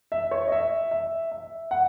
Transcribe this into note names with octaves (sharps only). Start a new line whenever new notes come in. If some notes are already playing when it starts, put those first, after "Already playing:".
E5
C#5
D#5
E5
E5
E5
F#5